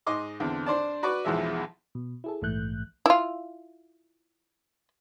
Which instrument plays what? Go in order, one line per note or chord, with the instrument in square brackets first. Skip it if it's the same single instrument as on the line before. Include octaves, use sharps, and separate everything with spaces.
[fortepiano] G#2 D#5 C6 D6
E2 D3 C4
D4 C5 D5 A5
F#4 B4 D5 C#6 D6
B1 E2 E3 F3 G#3 E5
[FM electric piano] B2
E4 G#4 A4
A#1 G#2 E3 A3 F#6 G6
[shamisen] E4 F4